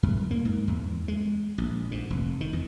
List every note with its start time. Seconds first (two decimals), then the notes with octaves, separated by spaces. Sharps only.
0.03 F#2
0.31 A#3
0.45 G#2
0.68 E2
1.08 G#3
1.58 A#1
1.91 G#2
2.10 F1
2.41 D#3
2.53 E2